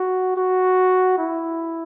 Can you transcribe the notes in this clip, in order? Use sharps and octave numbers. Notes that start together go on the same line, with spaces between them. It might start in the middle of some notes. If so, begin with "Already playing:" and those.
Already playing: F#4
F#4
E4